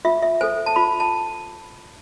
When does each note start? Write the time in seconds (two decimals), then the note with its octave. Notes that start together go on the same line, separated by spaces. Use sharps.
0.05 F4 E5
0.22 E5
0.41 A4 C5 G#5
0.66 A5
0.76 F4 B5
1.00 A5